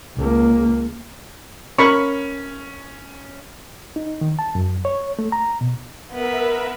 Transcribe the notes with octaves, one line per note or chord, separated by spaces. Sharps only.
C#2 A#3
C#4 A#4 B5 C#6
D#4
D#3
A5
F#2
C#5
A3
A#5
B2
B3 A#4 B4 E5